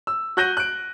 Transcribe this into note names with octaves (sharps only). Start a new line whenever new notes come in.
E6
F#4 F#6 G6 A#6 D#7 G7
F#6 D7